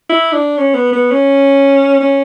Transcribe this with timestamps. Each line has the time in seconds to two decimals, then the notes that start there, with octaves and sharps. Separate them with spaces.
0.09 E4
0.32 D4
0.57 C#4
0.74 B3
0.93 B3
1.11 C#4
2.00 C#4